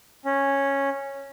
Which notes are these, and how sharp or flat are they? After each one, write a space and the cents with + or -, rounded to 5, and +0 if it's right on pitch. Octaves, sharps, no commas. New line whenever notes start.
C#4 -5